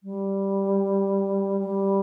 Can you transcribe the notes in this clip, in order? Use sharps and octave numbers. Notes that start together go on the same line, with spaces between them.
G3
G3